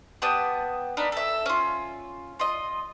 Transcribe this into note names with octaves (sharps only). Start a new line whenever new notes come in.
B3 G4 A5 D#6
D4 D#4 A#4 B5
A4 E5
C#4 F4
F4 D#5